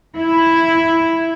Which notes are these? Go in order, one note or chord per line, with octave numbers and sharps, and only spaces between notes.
E4